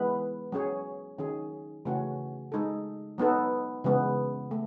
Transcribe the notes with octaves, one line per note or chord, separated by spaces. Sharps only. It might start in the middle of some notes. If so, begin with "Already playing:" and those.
Already playing: E3 G#3 B3 E4 B4
F#3 C#4 G#4 C#5
D#3 F#3 C#4 G#4
C#3 E3 A3 C#4 F#4
G#3 D#4 A4
F#3 B3 D#4 A4
C#3 E3 G#3 B3
A3